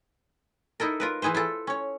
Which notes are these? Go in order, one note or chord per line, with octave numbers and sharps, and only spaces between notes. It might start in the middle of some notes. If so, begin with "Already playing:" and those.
D#4 E4 A4 A#4
F4 A#4 B4
E3 E4 G#4 B4 C5
E4 F4 A4
C#4 C#5